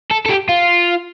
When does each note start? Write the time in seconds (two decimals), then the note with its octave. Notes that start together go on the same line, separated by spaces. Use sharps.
0.11 A4
0.26 A4
0.29 G4
0.49 F4